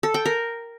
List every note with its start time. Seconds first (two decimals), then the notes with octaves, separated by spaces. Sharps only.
0.03 A4
0.14 G5
0.25 A#4